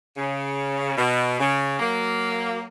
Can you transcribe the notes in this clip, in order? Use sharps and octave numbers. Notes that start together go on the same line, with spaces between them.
C#3
B2
C#3
F#3 A#3